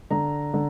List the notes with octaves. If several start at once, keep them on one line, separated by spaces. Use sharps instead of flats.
D3 A#5
D3